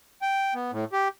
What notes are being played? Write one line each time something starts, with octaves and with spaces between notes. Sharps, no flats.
G5
B3
A2
G4